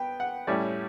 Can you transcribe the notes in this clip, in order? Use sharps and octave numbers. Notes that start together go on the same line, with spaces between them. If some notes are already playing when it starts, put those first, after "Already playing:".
Already playing: B3 G5
F#5
A2 G3 C#4 E4 D5